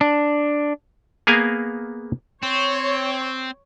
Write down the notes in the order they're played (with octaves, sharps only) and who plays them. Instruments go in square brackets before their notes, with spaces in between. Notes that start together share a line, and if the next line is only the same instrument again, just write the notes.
[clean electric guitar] D4
[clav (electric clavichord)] A#3 B3 G#4 A#4 F5 G#5
[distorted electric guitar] C4 [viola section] C#5